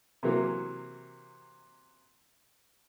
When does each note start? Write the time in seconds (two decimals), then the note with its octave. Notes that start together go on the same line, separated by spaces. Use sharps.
0.23 C3 E3 F#3 A#3